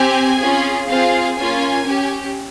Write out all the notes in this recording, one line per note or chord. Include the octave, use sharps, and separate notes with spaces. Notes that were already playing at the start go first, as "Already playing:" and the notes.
Already playing: C4 G4 G#5
C#4 F4 G#4
C4 F4 G#4 F5
A#3 C#4 F4 G#5
C#4 G4